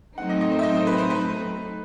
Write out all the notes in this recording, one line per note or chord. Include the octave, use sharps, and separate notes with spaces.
A2 F#3 A3 C4 D#4 F#5
D#5
D#5
C5
E5
D#5
C5
B4
C5
B4